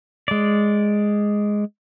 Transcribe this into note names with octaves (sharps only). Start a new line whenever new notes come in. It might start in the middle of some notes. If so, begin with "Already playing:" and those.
G#3 D5